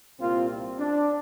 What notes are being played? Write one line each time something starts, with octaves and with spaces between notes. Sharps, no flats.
C2 A#2 A#3 C4 F4
C4
D4